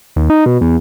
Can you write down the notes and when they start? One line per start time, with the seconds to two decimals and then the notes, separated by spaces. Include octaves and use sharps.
0.16 D#2
0.30 D#4
0.46 B2
0.61 E2